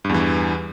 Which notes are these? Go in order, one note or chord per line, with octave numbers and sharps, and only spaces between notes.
E2 G2 E3